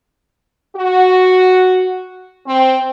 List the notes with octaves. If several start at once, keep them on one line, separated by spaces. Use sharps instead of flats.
F#4
C4